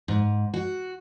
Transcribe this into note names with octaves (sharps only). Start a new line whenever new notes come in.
G#2
F#4